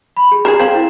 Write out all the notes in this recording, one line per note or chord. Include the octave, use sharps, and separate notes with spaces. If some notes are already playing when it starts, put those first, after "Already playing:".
B5
G#4
G#4 A#4 G#6 C7 E7
C4 F5 E7 F#7
E4